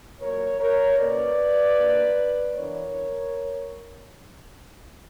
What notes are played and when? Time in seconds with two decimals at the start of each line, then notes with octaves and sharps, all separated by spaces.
0.20 A#2 F#3 A#3 A#4 C#5
0.59 A#4 C#5
0.98 B2 A#3 C#4 B4 D5
1.76 A#2 A#3 D4
2.54 E3 B3 D4 A#4 C#5